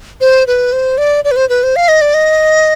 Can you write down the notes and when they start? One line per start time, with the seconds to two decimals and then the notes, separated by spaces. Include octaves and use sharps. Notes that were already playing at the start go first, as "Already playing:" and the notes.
0.21 C5
0.47 B4
0.72 C5
0.98 D5
1.24 D5
1.31 B4
1.36 C5
1.49 B4
1.63 C5
1.76 F5
1.88 D#5
2.01 D5
2.14 D#5